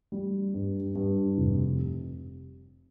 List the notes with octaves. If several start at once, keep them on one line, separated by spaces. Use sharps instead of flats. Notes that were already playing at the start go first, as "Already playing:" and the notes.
G3
G2
G2
F1